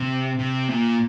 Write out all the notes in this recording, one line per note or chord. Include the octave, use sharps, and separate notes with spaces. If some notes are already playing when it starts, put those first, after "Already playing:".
Already playing: C3
C3
A#2